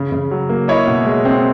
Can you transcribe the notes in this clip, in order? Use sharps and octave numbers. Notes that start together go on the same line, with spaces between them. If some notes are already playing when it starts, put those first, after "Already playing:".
Already playing: C#3
C#3
F#3
A#3
E4 C#5 D#5
B2
G#3
C4